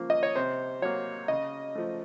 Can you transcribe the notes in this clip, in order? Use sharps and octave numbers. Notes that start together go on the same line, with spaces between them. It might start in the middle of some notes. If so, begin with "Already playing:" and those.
Already playing: C#3 F3 A#3
D#5
C#5
C3 C5
F#3 A#3 C#5
C#3 D#5
F3 A3